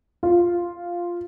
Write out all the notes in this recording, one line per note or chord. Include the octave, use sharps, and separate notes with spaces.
F4